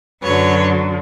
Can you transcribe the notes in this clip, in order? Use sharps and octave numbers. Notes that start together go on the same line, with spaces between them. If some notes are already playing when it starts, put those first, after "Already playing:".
F#2 D3 F#3 B4 C#5